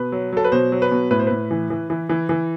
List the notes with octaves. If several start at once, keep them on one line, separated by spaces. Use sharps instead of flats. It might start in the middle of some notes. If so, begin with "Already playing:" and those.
Already playing: B2 B4
F#3
F#3 A4
B4
B2 C5
F#3
B4
B2
A2 B4
C5
A2 B4
E3
E3
E3
E3
E3